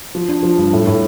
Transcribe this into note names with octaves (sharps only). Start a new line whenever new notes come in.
F3
D4
F3
G2
A2
A2